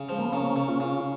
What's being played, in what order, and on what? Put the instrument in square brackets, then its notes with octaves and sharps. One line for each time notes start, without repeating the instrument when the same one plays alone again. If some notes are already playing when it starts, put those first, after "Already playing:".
Already playing: [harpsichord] C#3
[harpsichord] F3 [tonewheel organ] G#3
[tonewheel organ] A#3
B3
[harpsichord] C#3 [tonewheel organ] A#3 C#4
[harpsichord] C#3
[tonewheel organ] C#4 F4
[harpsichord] C#3